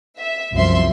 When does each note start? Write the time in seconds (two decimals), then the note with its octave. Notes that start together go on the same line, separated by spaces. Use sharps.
0.18 E5
0.54 C2 F#2 F3 E5 C6